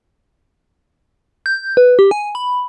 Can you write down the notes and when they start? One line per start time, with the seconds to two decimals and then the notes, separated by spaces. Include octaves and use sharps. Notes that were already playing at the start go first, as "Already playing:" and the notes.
1.46 G6
1.77 B4
1.99 G4
2.11 G#5
2.35 B5